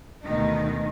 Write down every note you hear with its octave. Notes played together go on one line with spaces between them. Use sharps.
D2 B2 D#3 D#4